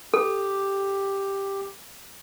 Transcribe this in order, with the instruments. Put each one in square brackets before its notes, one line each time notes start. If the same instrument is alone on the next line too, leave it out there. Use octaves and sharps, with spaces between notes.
[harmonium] G4 [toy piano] A4